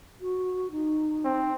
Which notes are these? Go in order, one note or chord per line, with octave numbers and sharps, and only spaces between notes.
F#4
D#4
C4